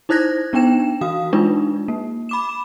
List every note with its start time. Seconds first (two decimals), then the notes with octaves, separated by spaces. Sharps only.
0.09 D#4 E4 C5 F#6 G#6 A#6
0.53 B3 D4 D#4 G5 E7
1.01 E3 F#4 F5 D#6
1.33 G#3 D4 D#4 F4 B4
1.88 A#3
2.29 B5 D6 E7